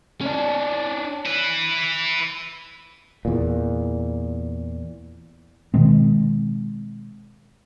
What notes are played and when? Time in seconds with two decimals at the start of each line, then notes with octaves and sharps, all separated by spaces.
0.21 C#4 D4
1.25 E4 B4
3.25 E2 A#2
5.74 B2 D#3 G#3 C4